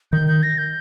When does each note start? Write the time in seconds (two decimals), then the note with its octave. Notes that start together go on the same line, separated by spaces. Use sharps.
0.12 D#3 G6
0.28 G6
0.43 A#6
0.58 G6